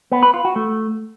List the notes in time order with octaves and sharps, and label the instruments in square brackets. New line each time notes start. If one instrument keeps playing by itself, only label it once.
[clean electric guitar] B3
B4
F4
F#4
A3